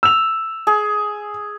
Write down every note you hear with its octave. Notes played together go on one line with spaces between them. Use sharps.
E6 F7
G#4